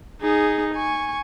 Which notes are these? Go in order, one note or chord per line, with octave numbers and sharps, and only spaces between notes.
D#4 G#4
G#5 C#6